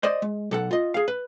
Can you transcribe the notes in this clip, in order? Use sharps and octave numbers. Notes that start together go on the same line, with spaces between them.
C5 D5 D#5
G#3
B1 A4 F#5
F4 D#5
G#4 F5
B4